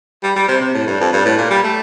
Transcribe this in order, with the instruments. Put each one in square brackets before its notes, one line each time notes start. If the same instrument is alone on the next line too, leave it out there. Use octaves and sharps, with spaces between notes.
[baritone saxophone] G3
G3
C3
C3
A2
G2
F2
G2
A2
A#2
G3
A3